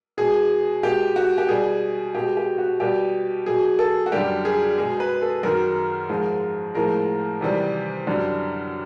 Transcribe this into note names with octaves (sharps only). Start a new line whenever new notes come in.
B2 G#3 G#4
B2 G#3 G4
F#4
G4
B2 G3 G#4
B2 G#3 G4
G4
F#4
B2 G3 G4
B2 F#3 G#4
A4
F#4
F#2 D3 G3 G4
G#4
B2 G#3 G#4
B4
A4
F#2 D#3 F#3 A#4
G#2 F3 G#3
A2 F3 G#3 A#4
E2 C3 D#3 G3
F#2 D3 G3